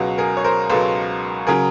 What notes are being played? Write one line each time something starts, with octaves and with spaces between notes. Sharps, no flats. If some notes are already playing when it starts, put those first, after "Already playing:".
Already playing: C#2 B2 F#3
G#4 A#4
C#5
A#4 C5
C#2 B2 F#3 A4 B4
C#3 F#3 G#4 A#4